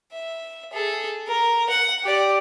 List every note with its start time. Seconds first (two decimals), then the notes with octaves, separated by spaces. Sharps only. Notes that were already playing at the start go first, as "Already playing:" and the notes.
0.12 E5
0.73 G#4 A4
1.28 A#4
1.69 F#5
2.03 G4 D5